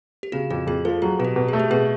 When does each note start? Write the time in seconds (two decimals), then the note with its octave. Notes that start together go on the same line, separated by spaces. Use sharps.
0.23 G4
0.32 C#3 F#4
0.50 F2 F#4
0.67 F2 G#4
0.85 F3 A4
1.02 F#3 G#4
1.19 B2 F#4
1.25 G4
1.36 B2
1.48 A3 G#4
1.59 G4
1.70 B2 G#4